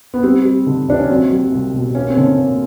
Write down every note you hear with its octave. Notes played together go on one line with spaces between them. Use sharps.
B3
G3 C4
G3
D3
D#2 D4
C#4
F#3 C4
F#3
C2
B2
A#3 C#4
C4
D3
C#4
A#3